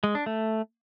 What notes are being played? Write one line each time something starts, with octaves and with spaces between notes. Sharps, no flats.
G#3
D4
A3